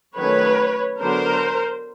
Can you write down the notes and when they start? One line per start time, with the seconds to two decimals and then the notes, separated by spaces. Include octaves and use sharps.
0.15 D#3 F#3 A3 C#4 B4 C#5
1.00 D3 F#3 B3 D4 A#4 C5